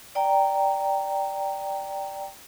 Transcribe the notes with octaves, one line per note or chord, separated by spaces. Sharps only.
D5 G5 A#5